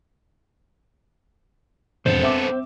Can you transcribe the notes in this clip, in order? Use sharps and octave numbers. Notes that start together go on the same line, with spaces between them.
E1 F2 B3 C4 A4 C5
C4 E5 D6